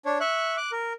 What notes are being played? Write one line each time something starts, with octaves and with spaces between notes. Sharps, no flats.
D4 C#5
E5 C#6 F#6
D6 F#6
A#4